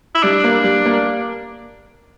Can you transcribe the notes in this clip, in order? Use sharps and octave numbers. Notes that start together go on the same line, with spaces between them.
E4
G3 D4
A#3
G3
A#3